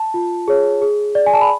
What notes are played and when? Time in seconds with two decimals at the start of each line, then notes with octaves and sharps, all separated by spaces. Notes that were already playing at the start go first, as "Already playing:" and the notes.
Already playing: A5
0.14 F4
0.48 G#4 C#5
0.82 G#4
1.15 D5
1.26 G#5
1.34 A5
1.41 B5